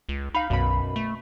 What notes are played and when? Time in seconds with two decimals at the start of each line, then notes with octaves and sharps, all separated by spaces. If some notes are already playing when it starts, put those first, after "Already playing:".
0.09 C#2
0.34 D#4 F5 B5
0.50 B1 F#2 B2 B5
0.96 A3